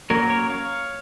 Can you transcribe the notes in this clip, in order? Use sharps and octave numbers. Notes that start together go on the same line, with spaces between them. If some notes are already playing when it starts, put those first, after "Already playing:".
F#3 A#3 C#4 A#4 C#5
A#4 C#5
C#5 F5